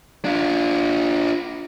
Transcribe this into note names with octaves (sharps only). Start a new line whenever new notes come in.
D4 F4